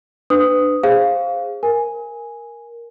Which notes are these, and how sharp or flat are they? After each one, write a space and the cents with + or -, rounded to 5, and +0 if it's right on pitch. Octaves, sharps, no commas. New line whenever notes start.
D4 +10 B4 +35 D#6 +0
G#4 -20 C5 +15 F5 +0
A#4 +5 G#5 +0